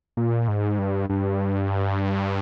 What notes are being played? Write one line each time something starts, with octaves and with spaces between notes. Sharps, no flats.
A#2
G#2
G2
G2